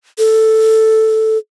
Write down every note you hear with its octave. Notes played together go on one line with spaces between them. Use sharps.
A4